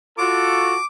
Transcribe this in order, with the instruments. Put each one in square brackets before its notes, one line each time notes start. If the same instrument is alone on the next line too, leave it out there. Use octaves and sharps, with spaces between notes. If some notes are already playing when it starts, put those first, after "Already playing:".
[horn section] F4 F#4 A4 [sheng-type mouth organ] D6